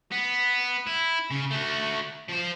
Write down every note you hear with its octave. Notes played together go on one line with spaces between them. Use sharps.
B3
E4
C#3
A3 F#4
F3 C5